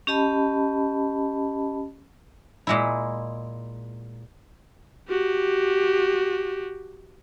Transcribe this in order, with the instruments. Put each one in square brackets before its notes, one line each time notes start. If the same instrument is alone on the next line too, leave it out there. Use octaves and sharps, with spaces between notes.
[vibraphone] C#4 G4 D#5 A5 B5
[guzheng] A#2 G#3 E4
[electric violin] F#4 G4